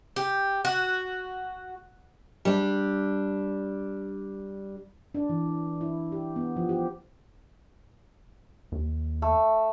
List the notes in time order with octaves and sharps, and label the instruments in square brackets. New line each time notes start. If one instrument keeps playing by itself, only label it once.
[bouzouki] G4
F#4
[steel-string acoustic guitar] G3 D4
[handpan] D4
E3
E4
G4
B3
F3
G4
[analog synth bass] D#2
[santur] A3